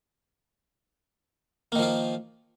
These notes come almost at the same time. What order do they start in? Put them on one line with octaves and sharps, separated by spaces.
A#3 D#3 F3 F4